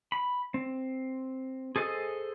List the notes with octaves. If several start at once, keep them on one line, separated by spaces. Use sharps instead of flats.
B5
C4
G#4 A4 C5 D#5 G#5